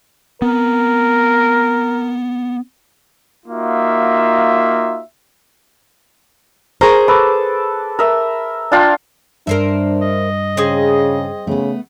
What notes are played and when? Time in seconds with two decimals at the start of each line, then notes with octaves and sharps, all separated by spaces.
0.42 B3 C4 A#4
3.46 A#3 D#4 F4 F#4 E5
6.81 G#4 A#4 C5 A#5 C#6
7.08 A4 B4 D6
7.99 A#4 E5
8.72 D4 F4 G5
9.47 G2 D4 A#4 C5 E5
10.01 D#5
10.57 C#3 C4 G#4
11.47 C#3 A3 B3